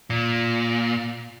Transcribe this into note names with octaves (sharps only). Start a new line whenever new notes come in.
A#2